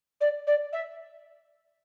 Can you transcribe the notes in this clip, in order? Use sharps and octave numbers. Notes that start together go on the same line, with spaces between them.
D5
D5
E5